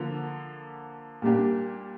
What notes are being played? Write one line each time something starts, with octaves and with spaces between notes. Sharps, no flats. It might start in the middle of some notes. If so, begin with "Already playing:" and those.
Already playing: D3 F3 A#3
A#2 G3 A#3 D4 G4